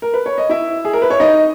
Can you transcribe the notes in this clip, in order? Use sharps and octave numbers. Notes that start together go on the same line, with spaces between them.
A#4
B4
C#5
D#5
E4 E5
G#4
A#4
B4
C#5
D#4 D#5